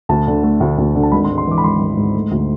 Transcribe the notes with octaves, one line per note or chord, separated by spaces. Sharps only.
D2 A5
D3
A3
D2
D2
D3
A5
G#1 B5
C6
G#2
C6
E3 D6
B5
G#1 C6
G#1
G#2
A3
D2